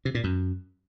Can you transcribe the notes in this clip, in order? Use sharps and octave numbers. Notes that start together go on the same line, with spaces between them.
C3
A#2
F#2